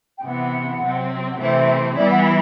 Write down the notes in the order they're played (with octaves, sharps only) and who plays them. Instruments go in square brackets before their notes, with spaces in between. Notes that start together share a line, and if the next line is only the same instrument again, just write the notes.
[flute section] G5
[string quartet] C3 E3 B3 [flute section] F#5
[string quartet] C3 F#3 C4
[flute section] F#5
[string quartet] C3 E3 A3 C4 [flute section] E5
[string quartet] E3 G3 B3 E4 [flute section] D5
[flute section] F#5